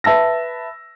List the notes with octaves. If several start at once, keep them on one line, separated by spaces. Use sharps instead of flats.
B4 E5 A5 E6 A#6